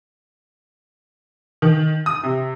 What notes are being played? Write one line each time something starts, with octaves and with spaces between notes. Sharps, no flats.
D#3
D#6
C3